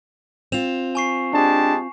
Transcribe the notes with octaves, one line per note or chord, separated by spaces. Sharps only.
C4 F4 E7 F7
G#5 C#6 C7
G#3 D4 G4 A5